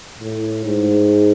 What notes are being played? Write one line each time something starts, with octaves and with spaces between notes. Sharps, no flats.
A2
G#2